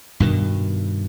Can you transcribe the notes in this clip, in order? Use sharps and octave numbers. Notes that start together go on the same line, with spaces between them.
G2 B2 D#3